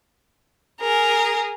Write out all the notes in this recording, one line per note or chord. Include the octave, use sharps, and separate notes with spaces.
G#4 A#4